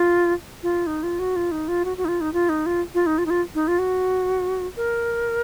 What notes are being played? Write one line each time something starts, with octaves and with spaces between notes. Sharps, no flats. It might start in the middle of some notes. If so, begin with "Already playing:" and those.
Already playing: F4
F4
D#4
F4
F#4
F4
D#4
F4
F#4
F#4
D#4
F4
D#4
F4
D#4
F4
F4
D#4
F4
D#4
F4
D#4
F4
F#4
A#4